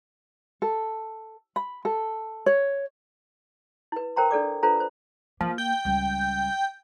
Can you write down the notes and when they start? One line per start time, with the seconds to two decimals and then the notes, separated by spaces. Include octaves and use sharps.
0.62 A4
1.56 B5
1.85 A4
2.46 C#5
3.92 E4 B4
4.16 A#4 C5 G5 A#5 C6
4.31 D4 A4 D5 D6
4.63 D4 F4 A4 B4 C5 A#5
4.76 B4 C5
5.41 F3 A#3
5.58 G5
5.85 C#2 G3